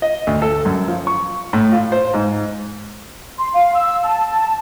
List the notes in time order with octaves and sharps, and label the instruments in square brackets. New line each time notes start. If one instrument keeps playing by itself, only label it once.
[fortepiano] D#5
D2
A4
F#2
F3
C#6
A2
F4
C5
G#2
[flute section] C6
F5
E6
A5